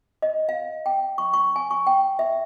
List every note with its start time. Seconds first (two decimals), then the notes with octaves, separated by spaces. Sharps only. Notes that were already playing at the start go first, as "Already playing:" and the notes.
0.22 D#5
0.49 F5
0.86 G5
1.18 C#6
1.34 C#6
1.56 G#5
1.71 C#6
1.87 G5
2.19 E5